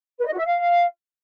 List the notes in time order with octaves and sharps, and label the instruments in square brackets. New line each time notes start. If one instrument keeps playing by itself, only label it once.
[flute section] B4
D#5
F#4
E5
F5